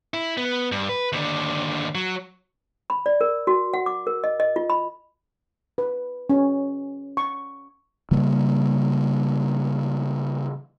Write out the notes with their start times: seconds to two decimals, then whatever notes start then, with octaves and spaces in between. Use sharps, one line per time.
0.14 E4
0.37 B3
0.72 G2
0.89 B4
1.12 D#2 D3
1.95 F#3
2.90 B5
3.06 D5
3.21 A#4
3.47 F#4
3.74 F#5
3.86 D6
4.07 A#4
4.24 D#5
4.40 D#5
4.56 F4
4.70 B5
5.78 B4
6.30 C#4
7.17 C#6
8.11 C#3 E3 G3 A#3